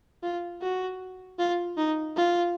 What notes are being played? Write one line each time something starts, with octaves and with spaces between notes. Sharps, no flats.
F4
F#4
F4
D#4
F4